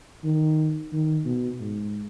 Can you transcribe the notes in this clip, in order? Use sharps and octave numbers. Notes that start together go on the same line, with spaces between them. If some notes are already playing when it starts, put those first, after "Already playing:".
D#3
D#3
B2
G#2